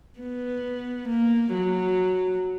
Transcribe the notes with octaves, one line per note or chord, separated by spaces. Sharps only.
B3
A#3
F#3